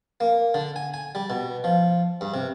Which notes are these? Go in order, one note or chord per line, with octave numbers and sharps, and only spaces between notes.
A#3
D3
G#5
G#5
G3
B2
F3
G2
C3